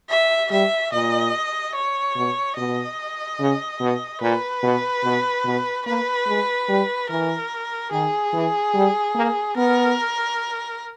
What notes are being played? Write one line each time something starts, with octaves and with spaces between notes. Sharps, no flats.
E5
G3 E5
A#2 D#5
C#5
B2
B2 D#5
C#3
B2
A#2 B4
B2
B2
B2
A#3 B4
G#3
G3
E3 A#4
D#3 G#4
E3
G3
A#3
B3 A#4